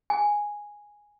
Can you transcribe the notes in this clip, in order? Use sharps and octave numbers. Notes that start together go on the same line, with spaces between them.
G#5